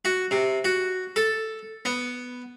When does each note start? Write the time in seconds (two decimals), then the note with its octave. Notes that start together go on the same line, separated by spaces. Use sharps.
0.05 F#4
0.31 C3
0.65 F#4
1.16 A4
1.85 B3